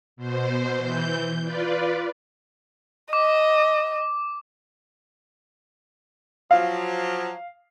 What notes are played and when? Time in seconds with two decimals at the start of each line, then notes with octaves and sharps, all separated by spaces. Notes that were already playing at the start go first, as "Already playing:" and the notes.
0.16 B2 C5
0.78 E3 G6
1.44 F4 B4 D5
3.13 D#5 D6
6.51 F3 F#3 F5